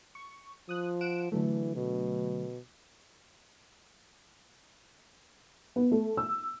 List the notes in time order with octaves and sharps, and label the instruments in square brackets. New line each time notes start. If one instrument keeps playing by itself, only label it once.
[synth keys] C#6
[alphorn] F3 [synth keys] D#6 F#6
[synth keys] F#5 D7 E7
[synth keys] D3 F#3 A3 [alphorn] E3
[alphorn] B2
[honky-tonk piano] B3
A3
E6